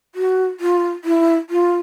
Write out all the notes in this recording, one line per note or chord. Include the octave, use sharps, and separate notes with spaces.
F#4
F4
E4
F4